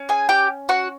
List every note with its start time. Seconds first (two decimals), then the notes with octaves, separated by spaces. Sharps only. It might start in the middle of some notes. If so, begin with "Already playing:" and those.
Already playing: C#4
0.09 G#4 G#5
0.29 G4 G5
0.69 F#4 F#5